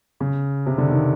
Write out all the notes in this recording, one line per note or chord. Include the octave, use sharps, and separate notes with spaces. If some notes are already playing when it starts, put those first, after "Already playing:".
C#3
C3
D3
D#3